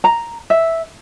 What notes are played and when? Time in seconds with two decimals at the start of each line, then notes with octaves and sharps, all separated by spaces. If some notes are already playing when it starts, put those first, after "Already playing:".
0.04 A#5
0.50 E5